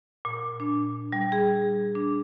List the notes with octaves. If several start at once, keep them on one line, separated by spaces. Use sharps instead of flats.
A#2
D4
G3
G#4
D4